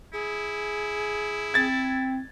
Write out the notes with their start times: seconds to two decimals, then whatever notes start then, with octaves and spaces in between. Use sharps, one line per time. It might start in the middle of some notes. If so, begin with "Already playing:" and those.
0.13 E4 G#4
1.54 C4 G#6 A6